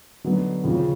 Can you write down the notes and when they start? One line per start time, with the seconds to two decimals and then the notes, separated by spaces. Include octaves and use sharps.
0.24 D3 F#3 B3 D#4
0.64 D#2 C#3 F3